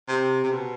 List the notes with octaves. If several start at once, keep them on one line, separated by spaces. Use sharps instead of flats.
C3
C3
B2